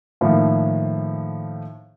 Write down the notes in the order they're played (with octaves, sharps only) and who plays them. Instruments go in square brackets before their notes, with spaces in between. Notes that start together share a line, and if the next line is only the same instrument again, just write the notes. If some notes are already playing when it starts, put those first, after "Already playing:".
[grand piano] A2 D#3 F3 A#3